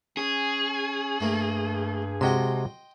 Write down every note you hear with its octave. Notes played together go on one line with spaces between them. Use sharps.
C#4 G#4
G2 A3 A#3
C3 G#3 F#4 D#5 G5 C6